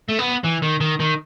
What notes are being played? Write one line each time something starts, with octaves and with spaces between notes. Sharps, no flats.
A3
B3
E3
D#3
D#3
D#3